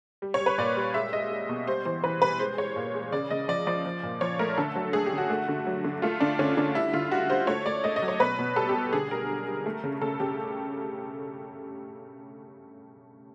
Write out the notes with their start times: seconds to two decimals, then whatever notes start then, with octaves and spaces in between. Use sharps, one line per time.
0.22 G3
0.34 C#5
0.40 G3
0.46 B4
0.58 A#2 D5
0.77 G3
0.94 G#3 E5
1.12 G#3 D#5
1.31 G#3
1.49 B2
1.67 G3 C5
1.85 E3 C5
2.04 E3 B4
2.22 G3 B4
2.39 G#3 C5
2.58 G#3 C#5
2.76 A#2
2.94 G#3
3.12 C#3 D5
3.31 C#3 D#5
3.48 F3 D5
3.67 F3 D5
3.85 F3
4.03 A#2
4.21 F3 C#5
4.39 A3 A#4
4.58 D3 A4
4.76 F#3
4.93 A3 G#4
5.06 G4
5.13 D3
5.18 F#4
5.30 A3
5.48 D3
5.67 F#3
5.84 D3
6.02 A3 F4
6.20 D3 D4
6.39 D3 C#4
6.57 D3 D4
6.75 G3 E4
6.93 D3 F4
7.12 G3 F#4
7.30 G3 C5
7.47 A3 C#5
7.66 A3 D5
7.84 A3 D#5
7.96 D#5
8.02 F#3
8.08 C#5
8.20 B2 B4
8.39 B2
8.56 G3 A4
8.69 G4
8.75 G3
8.93 D3 G#4
9.11 G3 A#4
9.29 G3
9.47 G3
9.66 A3
9.84 C#3
10.02 C#3 A4
10.20 C#3 G4